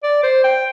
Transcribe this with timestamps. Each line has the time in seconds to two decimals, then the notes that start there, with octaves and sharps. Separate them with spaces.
0.03 D5
0.23 C5
0.44 G5